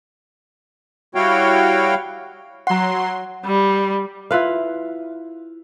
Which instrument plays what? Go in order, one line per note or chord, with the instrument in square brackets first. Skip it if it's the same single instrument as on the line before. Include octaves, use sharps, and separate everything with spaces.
[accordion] G3 E4 F#4 C#5 F5 G5
[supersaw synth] F#3 C6 [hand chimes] F#5 A#5
[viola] G3
[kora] E4 F4 B4 F5